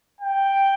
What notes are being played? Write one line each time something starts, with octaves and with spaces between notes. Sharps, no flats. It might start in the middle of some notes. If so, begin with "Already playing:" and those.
G5